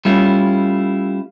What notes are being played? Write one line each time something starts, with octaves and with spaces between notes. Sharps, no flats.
G3 A3 C#4 E4 F4